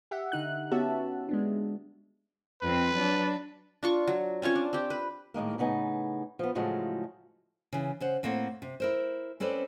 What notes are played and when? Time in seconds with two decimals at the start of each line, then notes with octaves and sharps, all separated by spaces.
0.11 G4 E5 F#5
0.32 D3 D#4 F#6
0.71 B3 C#4 F#4 G4 E5 A5
1.29 G#3 B3 D4
2.62 F2 C4 B4
2.94 F#3 D4
3.83 D4 F4 C#6
4.07 F#3
4.42 C4 C#4 F4 C#5
4.55 D4
4.73 C4 G4
4.90 B4
5.34 A2 D#3 G#3 A#3
5.58 A2 C#3 B3 D#4 G#5
6.39 F3 B3
6.55 A2 C#3 F3 F#3 G#3 A3
7.73 C#3 E3
8.00 C#3 C5 F#5
8.23 A2 A#3 C4 C5 F#5
8.62 C3
8.80 E4 A#4 C5
9.40 C4 C#4 A4 B4 C5 D5